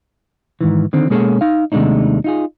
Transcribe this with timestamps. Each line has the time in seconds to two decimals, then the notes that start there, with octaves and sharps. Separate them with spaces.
0.61 G#2 D#3 E3
0.93 D3 D#3 C4
1.10 B2 G#3 A#3 C#4 G#4 A4
1.41 D#4 F5
1.72 D#2 C3 G#3 A3 D4 D#4
2.24 D#4 F4 G#4